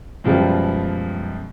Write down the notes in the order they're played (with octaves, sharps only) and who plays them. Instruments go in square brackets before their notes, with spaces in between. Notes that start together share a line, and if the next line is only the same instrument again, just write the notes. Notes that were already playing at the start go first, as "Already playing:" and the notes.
[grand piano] F#2 B2 F3 G3 G#3